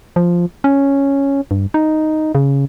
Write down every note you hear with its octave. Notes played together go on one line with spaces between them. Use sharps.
F3
C#4
G2
D#4
C#3